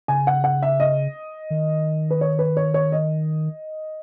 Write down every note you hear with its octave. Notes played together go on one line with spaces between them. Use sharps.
C#3 G#5
F#5
F#5
E5
D#5
D#3
B4
C#5
B4
C#5
C#5
D#5